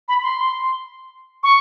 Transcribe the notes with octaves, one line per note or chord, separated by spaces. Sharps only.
B5
C6
C#6